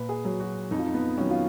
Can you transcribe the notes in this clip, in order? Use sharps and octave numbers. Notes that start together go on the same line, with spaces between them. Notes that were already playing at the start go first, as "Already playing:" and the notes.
Already playing: A#2 B4
G#4
F#3
F#4
F2 D#4
F4
D#4
B3
D#3 F#3 C#4
F4